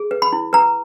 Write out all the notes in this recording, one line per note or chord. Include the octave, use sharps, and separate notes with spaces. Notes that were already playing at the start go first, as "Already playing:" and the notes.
Already playing: G#4
B4
B5
E4
B4 A#5